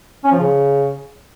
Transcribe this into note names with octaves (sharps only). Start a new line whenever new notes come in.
C#4
F3
C#3